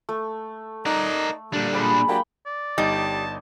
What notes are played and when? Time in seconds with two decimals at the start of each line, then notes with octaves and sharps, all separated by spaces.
0.09 A3
0.86 D#4 A#4 D5 D#5 F#5
1.53 A#2 D3 G3 D4
1.73 G#3 D5 B5
2.08 F#3 A#3 D4 G4 G5 B5
2.46 D5
2.78 G1 G3 D#4 D#5 A5